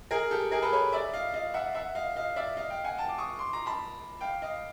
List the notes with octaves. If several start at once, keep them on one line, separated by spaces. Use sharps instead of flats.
G#4 A#4
G4 A4
G#4 A#4
A4 B4
B4 C#5
D5 E5
D#5 F5
D#5 F5
E5 F#5
E5 F#5
D#5 F5
D#5 F5
D5 E5
D#5 F5
F5 G5
F#5 G#5
G5 A5
D6
C#6 D#6
C6 D6
A#5 C6
A5 B5
F5 G5
D#5 F5